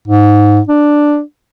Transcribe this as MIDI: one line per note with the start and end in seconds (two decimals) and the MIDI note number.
0.08 0.60 44
0.69 1.21 62